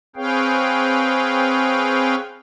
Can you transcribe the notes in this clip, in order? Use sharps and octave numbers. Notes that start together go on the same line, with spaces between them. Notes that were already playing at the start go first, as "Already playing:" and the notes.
C4 G#4 B4 C#5 F5 G5